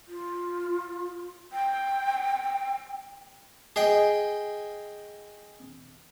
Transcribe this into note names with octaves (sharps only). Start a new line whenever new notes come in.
F4
G5
G#4 D#5 G5